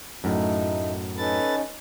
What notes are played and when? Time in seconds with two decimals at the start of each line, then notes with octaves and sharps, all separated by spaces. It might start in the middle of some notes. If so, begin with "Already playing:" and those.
0.24 F#2 A2 A3 D#4
1.17 C#4 D#4 A4 B4 A6